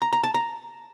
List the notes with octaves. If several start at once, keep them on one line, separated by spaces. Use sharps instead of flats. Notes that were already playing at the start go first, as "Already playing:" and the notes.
A#5
A#5
A5
A#5